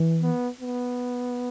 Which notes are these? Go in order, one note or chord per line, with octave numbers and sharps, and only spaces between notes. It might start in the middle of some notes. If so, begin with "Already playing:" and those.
Already playing: E3
B3
B3